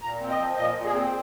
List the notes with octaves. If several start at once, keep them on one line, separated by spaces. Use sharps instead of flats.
A#2 A#5
C4
D#5
F3
A#2 D#5
A#2
G#4
C4